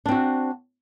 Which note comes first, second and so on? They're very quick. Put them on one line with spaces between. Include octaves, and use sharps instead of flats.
D4 C4 F#4